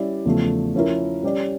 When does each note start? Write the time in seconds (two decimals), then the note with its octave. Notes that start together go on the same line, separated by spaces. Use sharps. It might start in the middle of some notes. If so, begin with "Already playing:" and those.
Already playing: G3 C#4 E4 D5
0.25 E2 C#3 F3 A3
0.75 F3 C#4 E4 A#4
1.23 G3 C#4 G4 D5